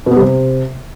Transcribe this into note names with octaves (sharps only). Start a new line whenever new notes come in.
B2
B3
G3
C3